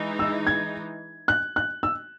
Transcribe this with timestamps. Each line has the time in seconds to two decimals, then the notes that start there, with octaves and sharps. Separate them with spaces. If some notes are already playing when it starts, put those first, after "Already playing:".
Already playing: E3 G#3 D#4
0.19 E6
0.47 G#6
1.28 F#6
1.56 F#6
1.83 E6